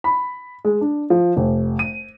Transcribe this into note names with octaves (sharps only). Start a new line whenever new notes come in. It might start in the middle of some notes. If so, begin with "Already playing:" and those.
B5
G#3
D4
F3
F1
D#7